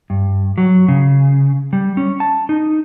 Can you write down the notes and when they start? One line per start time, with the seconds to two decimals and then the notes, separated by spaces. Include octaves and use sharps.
0.10 G2
0.58 F#3
0.88 C#3
1.73 G3
1.97 C#4
2.20 A5
2.49 D#4